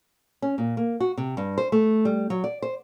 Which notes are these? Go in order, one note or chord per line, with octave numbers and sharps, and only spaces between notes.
C#4
A#2
A#3
F#4
C3
G2
C5
A3
G3
F#3
D5
C5